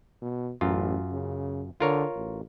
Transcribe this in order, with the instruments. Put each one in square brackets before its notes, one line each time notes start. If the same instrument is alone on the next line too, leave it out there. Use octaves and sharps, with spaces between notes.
[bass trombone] B2
[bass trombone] A1 [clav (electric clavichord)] F#2 F4
[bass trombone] C#3
[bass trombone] D3 [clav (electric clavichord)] F4 A#4 C#5
[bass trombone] A1